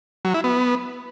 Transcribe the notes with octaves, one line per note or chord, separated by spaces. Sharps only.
F#3
E4
B3